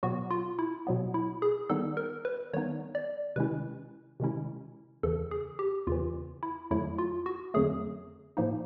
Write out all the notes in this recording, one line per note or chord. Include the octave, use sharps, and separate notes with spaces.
B2 F#3 B3 F#4
F4
E4
B2 F#3 B3
E4
G#4
D#3 G3 B3 D#4 A4
A#4
B4
D#3 G3 B3 D#4 C#5
D5
C3 D#3 G#3 C#4 E4 B4
C3 D#3 G#3 C#4 E4
E2 C#3 E3 A4
G#4
G4
E2 C#3 E3 F4
E4
F2 D3 F#3 A3 E4
F4
F#4
F2 D3 F#3 A3 G#4
A2 F3 A#3 D#4